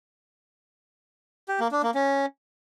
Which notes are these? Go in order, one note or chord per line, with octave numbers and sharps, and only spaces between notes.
G4
A#3
D4
A#3
C#4